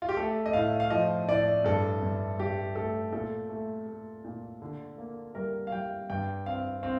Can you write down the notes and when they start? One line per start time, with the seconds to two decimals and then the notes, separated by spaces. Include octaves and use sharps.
0.02 F4
0.09 G4
0.17 A3 A4
0.46 D#5
0.53 A2 F5
0.80 F5
0.90 F3 D#5
1.28 A2 D5
1.64 G2 A4
2.02 G2
2.38 G2 G4
2.75 A3 A4
3.12 A#2 A4
3.50 A3
3.87 A3
4.25 A#2
4.62 D3
4.98 A#3
5.35 G3 A#4
5.67 F5
5.72 G3 G5
6.10 G2 G5
6.46 C4 F5
6.83 C4 F5